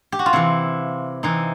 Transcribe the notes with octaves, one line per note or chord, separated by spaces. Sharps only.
G4
F#4
F4
C3 E3 E4
C3 E3 D#4